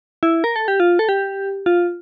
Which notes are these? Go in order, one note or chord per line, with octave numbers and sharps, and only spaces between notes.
E4
A#4
A4
G4
F4
A4
G4
F4